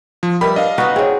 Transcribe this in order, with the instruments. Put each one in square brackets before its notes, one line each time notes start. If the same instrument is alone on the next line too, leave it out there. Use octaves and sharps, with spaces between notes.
[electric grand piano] F3
[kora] G3 [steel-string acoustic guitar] A#4 B4 E5 [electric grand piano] B5
[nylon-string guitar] D4 [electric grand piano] D#5 F5
[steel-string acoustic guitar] C#3 B3 [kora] D#4 F#4 B4
[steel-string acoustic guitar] E2 D4 [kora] C4 [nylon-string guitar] G#4 C#5